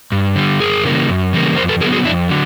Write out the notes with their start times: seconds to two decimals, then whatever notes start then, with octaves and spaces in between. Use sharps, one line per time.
0.12 G2
0.36 D3 G3
0.60 F#2 G#4 A#4
0.85 C#3 E3 G3 A#3
1.08 F#2
1.33 C#3 E3 G3 A#3
1.56 F2 A#4 C5
1.69 A4 B4
1.81 D3 F#3 B3 G#4 A#4
1.93 F#4 G#4
2.05 F2 D4 E4
2.29 D3 F#3